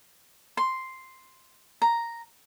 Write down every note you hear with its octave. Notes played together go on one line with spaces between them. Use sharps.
C6
A#5